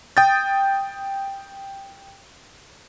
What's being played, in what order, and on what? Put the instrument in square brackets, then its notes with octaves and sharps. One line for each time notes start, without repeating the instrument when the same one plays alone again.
[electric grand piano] G5 D#6 G6 A6